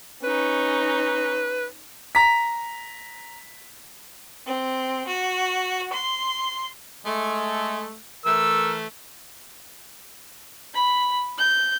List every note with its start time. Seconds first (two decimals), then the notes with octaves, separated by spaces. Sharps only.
0.24 C#4 D#4 B4
2.15 A#5 B6
4.46 C4
5.06 F#4
5.91 C6
7.06 G#3 A3
8.25 E3 A3 A#4 E6
10.74 B5
11.38 G6